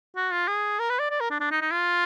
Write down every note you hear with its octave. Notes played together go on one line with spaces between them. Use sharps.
F#4
F4
G#4
A#4
B4
D5
D5
A#4
D4
D4
D#4
D#4
F4